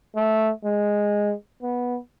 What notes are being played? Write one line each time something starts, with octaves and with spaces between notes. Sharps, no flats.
A3
G#3
B3